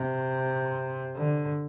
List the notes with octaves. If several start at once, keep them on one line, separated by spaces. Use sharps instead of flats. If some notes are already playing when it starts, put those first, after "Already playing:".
Already playing: C3
D3